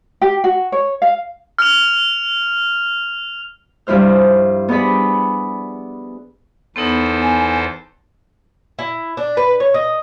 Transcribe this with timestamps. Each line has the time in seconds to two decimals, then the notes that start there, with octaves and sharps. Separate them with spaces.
0.22 G4
0.44 F#4
0.72 C#5
1.02 F5
1.59 F6 F7
3.87 G2 F3 E4 C5 F6
4.68 B3 G#4 D5 B5
6.76 E2 B3 D#4 A4 C5
7.22 G#5
8.79 E4
9.17 D4
9.37 B4
9.60 C#5
9.74 D#5